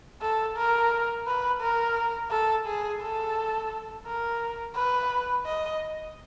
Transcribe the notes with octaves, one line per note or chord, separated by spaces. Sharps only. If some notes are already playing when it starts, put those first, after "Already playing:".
A4
A#4
B4
A#4
A4
G#4
A4
A#4
B4
D#5